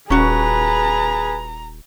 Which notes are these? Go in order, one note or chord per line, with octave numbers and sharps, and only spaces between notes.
D#1 C#4 F#4 G#4 B4 A#5